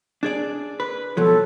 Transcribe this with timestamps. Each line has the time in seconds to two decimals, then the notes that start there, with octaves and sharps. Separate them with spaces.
0.23 D4 G#4 D5
0.80 B4
1.17 B2 F3 F#3 A4